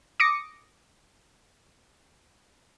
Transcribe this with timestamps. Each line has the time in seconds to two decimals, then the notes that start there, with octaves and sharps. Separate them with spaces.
0.20 D6 D#6 A#6 C#7